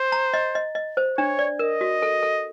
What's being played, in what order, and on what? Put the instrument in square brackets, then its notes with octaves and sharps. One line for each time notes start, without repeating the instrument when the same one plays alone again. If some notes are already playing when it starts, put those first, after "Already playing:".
Already playing: [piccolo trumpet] C5
[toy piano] A#5
D#5
D#5
D#5
C5
[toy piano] D4 [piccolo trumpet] C#5
[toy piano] D5
[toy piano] A#4 [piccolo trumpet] D#5
[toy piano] F#4
A4
A4